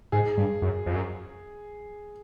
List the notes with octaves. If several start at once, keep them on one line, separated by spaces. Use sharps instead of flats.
G#2 G#4
G2
F#2
F2
F#2